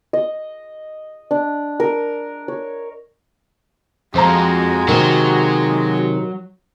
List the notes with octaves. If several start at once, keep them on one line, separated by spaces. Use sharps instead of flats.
D#5
D4
A#4
C#5
F2 G#3 F#4 C5 A#5
C3 D#3 F#3